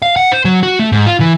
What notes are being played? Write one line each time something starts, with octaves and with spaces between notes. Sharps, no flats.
F5
F#5
C5
F#3
F#4
A3
G#2
F4
E3